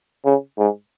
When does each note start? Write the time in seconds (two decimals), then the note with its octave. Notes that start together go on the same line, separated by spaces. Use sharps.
0.25 C#3
0.58 G#2